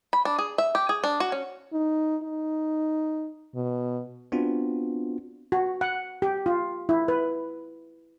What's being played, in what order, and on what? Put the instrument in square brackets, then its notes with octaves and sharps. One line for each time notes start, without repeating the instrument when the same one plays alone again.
[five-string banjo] B5
D4
G#4
E5
G4
G#4
D4
F#4
C#4
[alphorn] D#4
D#4
B2
[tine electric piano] B3 C4 D4 F4 F#4
[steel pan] F#4
F#5
G4
F4
E4
B4